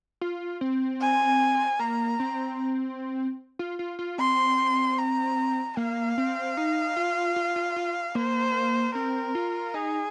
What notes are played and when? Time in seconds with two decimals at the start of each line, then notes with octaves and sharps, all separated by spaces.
0.21 F4
0.61 C4
1.01 G#5
1.79 A#3 A#5
2.20 C4
3.59 F4
3.79 F4
3.99 F4
4.18 C4 C6
4.98 A#5
5.77 A#3 F5
6.18 C4
6.57 D#4
6.97 F4
7.36 F4
7.56 F4
7.76 F4
8.15 A#3 C5
8.95 C4 A#4
9.35 F4
9.74 D#4 G#4